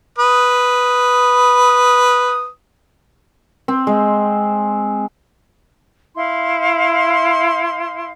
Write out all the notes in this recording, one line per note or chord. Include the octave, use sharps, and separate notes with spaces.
B4 D#6
C4
G#3
E4 F5 C6